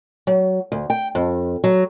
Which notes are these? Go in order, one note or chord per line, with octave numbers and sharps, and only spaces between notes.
F#3
D2
G5
F2
F#3